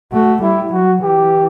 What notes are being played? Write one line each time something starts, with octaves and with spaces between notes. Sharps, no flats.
A3 F#4
G3 E4
F#3 F#4
E3 G4